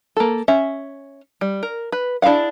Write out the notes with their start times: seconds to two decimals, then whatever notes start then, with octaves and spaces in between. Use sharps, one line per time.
0.17 A#3 A4
0.48 C#4 E5
1.41 G3
1.63 A#4
1.92 B4
2.22 D4 E4 G#4 F5 F#5